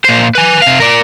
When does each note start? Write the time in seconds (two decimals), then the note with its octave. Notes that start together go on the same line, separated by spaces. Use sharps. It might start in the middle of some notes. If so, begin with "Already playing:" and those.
0.05 A#2 C5
0.35 B4 G#5
0.62 C3 F5
0.80 A#4 D5